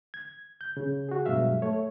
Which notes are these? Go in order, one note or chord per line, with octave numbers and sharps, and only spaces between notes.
G#6
G6
C#3
F#4 G#4
G2 B2 F#3 G#3 E5 F5
A3 C#5